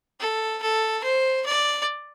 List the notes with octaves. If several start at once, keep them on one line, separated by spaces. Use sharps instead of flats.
A4
A4
C5
D5